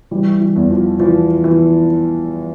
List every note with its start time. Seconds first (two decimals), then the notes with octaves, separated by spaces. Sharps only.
0.11 E3 G3
0.41 E3
0.56 E2
0.71 F3
1.00 E3 F3
1.44 E3